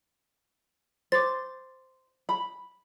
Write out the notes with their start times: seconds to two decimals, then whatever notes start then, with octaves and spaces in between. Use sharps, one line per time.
1.12 C5 D6 A6
2.29 B5